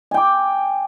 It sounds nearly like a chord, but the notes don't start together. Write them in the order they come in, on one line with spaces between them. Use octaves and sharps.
G#5 G5 D6